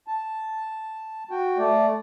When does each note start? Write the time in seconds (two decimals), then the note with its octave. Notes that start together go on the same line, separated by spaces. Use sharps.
0.07 A5
1.31 F#4 G5
1.58 A3 D5